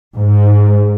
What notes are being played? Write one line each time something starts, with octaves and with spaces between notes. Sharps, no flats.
G#2